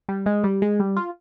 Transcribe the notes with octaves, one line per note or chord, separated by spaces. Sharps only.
G3
G#3
G3
G#3
G3
F4